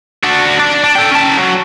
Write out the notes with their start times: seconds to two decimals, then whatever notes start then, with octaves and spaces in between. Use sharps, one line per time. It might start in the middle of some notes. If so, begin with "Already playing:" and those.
0.23 D4 F#4
0.60 D4 D5
0.84 D4
0.95 A4 G5
1.11 C#4 A5
1.37 F#3